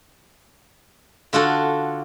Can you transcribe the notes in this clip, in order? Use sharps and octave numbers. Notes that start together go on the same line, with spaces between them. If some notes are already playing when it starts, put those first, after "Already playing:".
D3 F4 F#4 A4